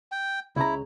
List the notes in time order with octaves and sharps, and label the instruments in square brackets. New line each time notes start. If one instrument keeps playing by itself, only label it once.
[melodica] G5
[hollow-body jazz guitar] C#2 C#3 A#5 [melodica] E4